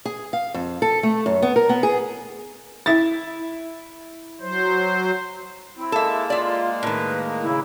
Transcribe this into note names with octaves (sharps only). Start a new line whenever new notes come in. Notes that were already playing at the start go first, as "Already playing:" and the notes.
G#4
F5
F2
A4
A3
F#2
B3
A#4
B3
G#4
E4 A6
F#3 C5
C4 E4
G#3 A#3 A4 E5
F4 D5 E5
A2 D#3 B4
C#3 E4